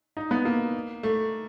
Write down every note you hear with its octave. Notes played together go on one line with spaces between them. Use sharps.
D#4
B3
A#3
A3